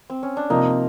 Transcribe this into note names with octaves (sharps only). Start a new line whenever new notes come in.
C4
C#4
D4
C3 F3 A#3 D#4